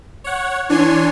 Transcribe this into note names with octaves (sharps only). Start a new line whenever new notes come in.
C#5 F#5
E3 D4 C#5 G#5 C6